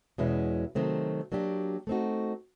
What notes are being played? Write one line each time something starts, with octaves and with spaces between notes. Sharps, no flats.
E2 B2 G#3 C#4 E4
C3 D#3 F#3 A3 C4
F#3 A#3 D4 G4
A3 C4 D#4 F#4